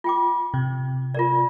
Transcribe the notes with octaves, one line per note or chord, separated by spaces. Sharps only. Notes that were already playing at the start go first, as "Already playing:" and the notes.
F4 G5 D6
C3
F4 A#4 D5